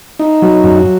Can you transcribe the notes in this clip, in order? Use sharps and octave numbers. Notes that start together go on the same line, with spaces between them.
D#4
F#3
F#2